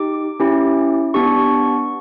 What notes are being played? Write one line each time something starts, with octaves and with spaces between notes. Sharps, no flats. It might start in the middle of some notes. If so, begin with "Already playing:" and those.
Already playing: D#4 G4 D6
C#4 E4 G4
B3 D4 G4 C#6